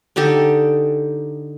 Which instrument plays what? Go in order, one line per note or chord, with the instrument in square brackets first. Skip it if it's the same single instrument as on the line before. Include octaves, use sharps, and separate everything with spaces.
[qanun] D3 D#4 G4 A4